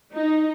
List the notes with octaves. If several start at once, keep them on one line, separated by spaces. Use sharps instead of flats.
D#4